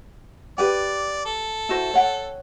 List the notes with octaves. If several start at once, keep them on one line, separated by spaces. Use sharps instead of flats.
G4 B4 D5 G5
A4
E4 F#4 C5
C#5 F#5 G5